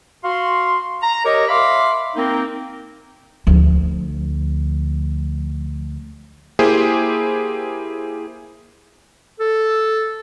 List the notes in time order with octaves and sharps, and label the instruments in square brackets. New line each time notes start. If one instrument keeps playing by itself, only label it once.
[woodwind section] F#4 F5 C6
A#5
G4 A#4 C#5 D#5
E5 F5 B5 C6 D6
A#3 C4 D#4 A#4
[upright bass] D2 F3
[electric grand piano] A#3 E4 G4 G#4 C5
[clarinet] A4